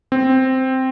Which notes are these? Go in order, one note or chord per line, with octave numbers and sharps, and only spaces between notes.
C4